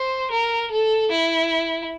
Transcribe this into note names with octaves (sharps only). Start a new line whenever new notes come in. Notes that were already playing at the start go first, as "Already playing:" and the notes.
Already playing: C5
A#4
A4
E4